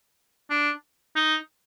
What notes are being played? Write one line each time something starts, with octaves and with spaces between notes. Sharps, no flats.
D4
D#4